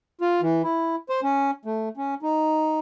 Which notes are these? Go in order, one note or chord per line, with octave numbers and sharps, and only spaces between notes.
F4
E3
E4
C5
C#4
A3
C#4
D#4